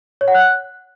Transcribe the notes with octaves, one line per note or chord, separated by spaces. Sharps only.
C#5
F#5
F#6